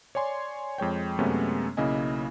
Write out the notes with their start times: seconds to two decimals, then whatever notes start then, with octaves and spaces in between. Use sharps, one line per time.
0.15 C#5 D5 G#5 C6
0.78 F2 G#3 C#5 G5
1.19 F#2 C3 G#3 A3 B3 C#4
1.77 B1 C#3 A#3 E4 D#5 G#5